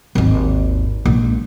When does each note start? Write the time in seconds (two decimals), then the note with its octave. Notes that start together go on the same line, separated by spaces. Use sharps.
0.15 G#1 D#2
1.06 A#1 G#3